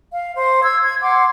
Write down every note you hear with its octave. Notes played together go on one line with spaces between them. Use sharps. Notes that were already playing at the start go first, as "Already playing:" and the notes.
F5
C5
E6 G#6
G#6
F#5 C6 D6